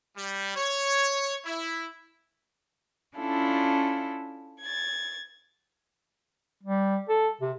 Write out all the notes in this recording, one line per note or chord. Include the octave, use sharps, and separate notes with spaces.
G3
C#5
E4
C#4 D4 E4 F4 A4
G#6 A6
G3
A4
C3